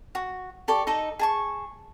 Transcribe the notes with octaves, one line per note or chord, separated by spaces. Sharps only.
F#4
G4 A4 D5 C#6
D#4 A4 D#5
G#4 A5 C#6